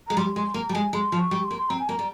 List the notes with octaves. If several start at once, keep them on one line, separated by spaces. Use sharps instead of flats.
G#3 A#5
G3 C6
G#3 C6
A#3 A#5
G3
G#3 G#5
G#3 C6
F3
C#6
G3
C6
A#3
C6
C4 A#5
G#5
A#3 A#5
G3